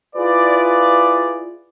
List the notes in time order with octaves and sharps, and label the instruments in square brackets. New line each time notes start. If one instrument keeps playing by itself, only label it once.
[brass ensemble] E4 F4 G#4 B4 D5